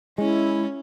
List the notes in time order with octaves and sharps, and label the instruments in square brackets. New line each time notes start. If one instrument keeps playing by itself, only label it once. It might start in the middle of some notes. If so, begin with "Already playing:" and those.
[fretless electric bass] G#3 [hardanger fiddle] C#4 [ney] E4